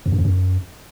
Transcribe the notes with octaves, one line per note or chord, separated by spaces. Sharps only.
F2
F#2
F2
F#2